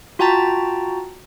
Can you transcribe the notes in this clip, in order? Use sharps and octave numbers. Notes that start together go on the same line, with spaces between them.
F4 F#4 G5 A5 A#5 A6